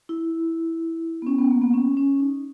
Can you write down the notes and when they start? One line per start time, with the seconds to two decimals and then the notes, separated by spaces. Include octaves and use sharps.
0.09 E4
1.22 B3
1.27 C#4
1.38 B3
1.50 A#3
1.62 B3
1.73 C#4
1.97 C#4
2.20 D#4